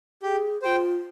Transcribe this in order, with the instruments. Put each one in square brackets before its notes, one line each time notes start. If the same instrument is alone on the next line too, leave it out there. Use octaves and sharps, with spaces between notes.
[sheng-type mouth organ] G4 [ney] G#4
[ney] F4 G#4 [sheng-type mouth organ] C5 G5